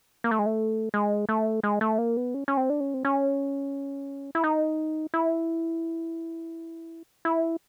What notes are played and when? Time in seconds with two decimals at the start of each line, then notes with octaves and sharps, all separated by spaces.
0.24 A#3
0.31 A3
0.39 G#3
0.46 A3
0.94 G#3
1.29 A3
1.63 G#3
1.81 A3
1.98 A#3
2.17 B3
2.34 C#4
2.48 C#4
2.57 C4
2.70 D4
2.80 C#4
2.94 C4
3.05 C#4
4.35 E4
4.44 D#4
5.14 E4
7.25 E4